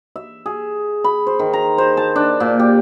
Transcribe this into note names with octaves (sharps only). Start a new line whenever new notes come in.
E5
G#4
B5
C5
D#3
A#5
C5
A5
D4
A#2
G4